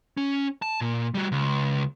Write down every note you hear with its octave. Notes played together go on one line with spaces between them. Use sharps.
C#4
A5
A#2
G3 F#4
C#2